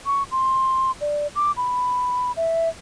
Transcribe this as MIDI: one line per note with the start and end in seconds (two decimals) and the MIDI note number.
0.06 0.23 85
0.32 0.91 84
1.01 1.27 74
1.36 1.52 86
1.57 2.32 83
2.37 2.69 76